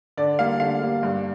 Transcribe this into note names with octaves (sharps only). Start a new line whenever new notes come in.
D3 D5
G3 A#3 F5
D3 F5
G3 A#3
G2